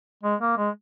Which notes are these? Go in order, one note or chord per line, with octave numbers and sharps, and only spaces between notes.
G#3
A#3
G#3